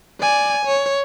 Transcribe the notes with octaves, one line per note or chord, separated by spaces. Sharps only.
D5 G#5
C#5